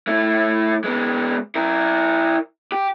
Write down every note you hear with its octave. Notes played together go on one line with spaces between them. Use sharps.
A3 E4
G#3 B3
E4 A#4
G4